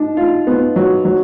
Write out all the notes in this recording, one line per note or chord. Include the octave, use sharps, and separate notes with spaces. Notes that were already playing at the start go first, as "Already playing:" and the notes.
Already playing: D4 D#4
F4
B3
F#3
F#3